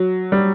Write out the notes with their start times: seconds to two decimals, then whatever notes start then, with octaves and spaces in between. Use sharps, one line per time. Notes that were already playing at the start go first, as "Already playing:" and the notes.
Already playing: F#3
0.32 G3